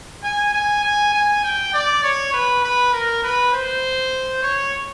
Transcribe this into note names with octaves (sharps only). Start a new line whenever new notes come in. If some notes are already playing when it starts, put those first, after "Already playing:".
G#5
G#5
G#5
G#5
G5
D5
C#5
B4
B4
A#4
B4
C5
C#5